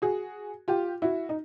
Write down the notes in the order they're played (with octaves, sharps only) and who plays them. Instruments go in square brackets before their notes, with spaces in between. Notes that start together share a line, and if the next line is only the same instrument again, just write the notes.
[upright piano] F#4 G#4
F4 G4
E4 F#4
D#4